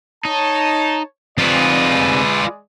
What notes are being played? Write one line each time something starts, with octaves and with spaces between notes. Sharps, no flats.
D#4 C#5 A5
F2 C3 G#3 F4 G#4 B4 D5